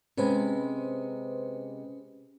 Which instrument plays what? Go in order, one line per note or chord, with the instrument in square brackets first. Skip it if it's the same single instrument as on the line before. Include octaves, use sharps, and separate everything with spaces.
[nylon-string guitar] C3 G#3 [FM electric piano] C#4 B4 C5